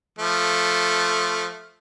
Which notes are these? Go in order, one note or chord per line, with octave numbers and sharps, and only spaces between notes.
F3 A3